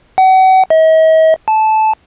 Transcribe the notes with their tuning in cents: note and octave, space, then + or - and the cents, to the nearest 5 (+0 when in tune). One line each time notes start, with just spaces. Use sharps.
F#5 +35
D#5 +45
A5 -15